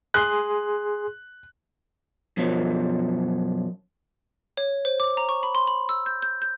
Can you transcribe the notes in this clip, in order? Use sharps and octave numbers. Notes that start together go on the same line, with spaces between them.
G#4 C6 F#6
F#2 B2 F3 F#3
C#5
C5
D6
A#5
C#6
B5
C6
B5
E6
G6
G6
G6